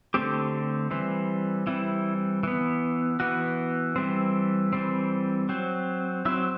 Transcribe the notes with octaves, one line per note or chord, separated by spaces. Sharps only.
D3 A3 C4 G4
E3 G3 C4
E3 G3 C4 E4
E3 B3
E3 B3 F#4
E3 G3 C4
E3 G3 C4
F#3 C4
F#3 C4 E4